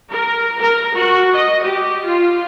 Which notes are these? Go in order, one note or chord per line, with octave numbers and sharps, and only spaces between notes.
A#4
A#4
F#4
D#5
G4
F4